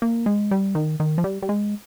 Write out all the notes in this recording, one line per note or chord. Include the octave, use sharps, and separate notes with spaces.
A#3
G#3
G3
D#3
D#3
F3
G3
G3
G#3